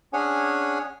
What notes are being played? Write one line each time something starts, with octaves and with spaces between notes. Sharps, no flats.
C#4 D4 G#4 C#5 F#5 G#5